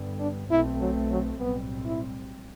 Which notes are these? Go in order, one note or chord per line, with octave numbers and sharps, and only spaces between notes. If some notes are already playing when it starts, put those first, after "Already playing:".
Already playing: G2 D3 G3 B3
D4
B1 B2 A3 C4 E4
F#3
F#3
B1 A2 G3 B3 C4
E4